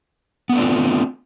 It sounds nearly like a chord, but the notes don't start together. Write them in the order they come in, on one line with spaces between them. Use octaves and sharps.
B3 A3 D4 F4 C4